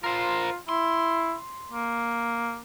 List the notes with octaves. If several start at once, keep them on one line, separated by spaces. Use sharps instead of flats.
F4 A#4 C5
E4 C6
A#3